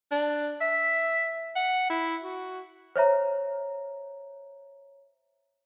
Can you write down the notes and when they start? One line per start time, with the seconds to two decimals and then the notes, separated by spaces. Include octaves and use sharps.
0.12 D4
0.61 E5
1.56 F#5
1.90 E4
2.23 F#4
2.96 C5 C#5 E5 A#5